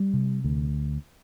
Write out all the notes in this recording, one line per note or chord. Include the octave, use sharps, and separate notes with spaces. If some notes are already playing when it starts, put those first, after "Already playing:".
Already playing: G3
C3
D2